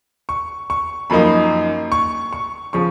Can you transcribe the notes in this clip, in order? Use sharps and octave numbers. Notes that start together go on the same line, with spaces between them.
C#6
C#6
F#2 F3 A#3 D#4 B5
C#6
C#6
C#3 F3 C#6